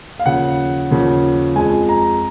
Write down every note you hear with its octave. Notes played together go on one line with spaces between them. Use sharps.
F5
D#2 C#3 F3 F#5
D#2 C#3 F3
F2 F3 G#3 G#5
A#5